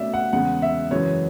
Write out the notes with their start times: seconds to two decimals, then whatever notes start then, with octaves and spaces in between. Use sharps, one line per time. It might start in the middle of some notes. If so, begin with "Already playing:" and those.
Already playing: B2 A3 C#4 D5 E5
0.13 F#5
0.33 E2 C#3 G#3 F#5
0.62 E5
0.91 F#2 C#3 E3 G#3 C#5